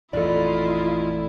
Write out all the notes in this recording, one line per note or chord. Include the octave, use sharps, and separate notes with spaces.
A1 F2 A#2 E4 F4 A4 D5 D#5